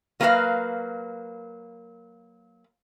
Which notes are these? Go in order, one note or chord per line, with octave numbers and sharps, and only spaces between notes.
F#3 A#3 C#4 G4 B4 F5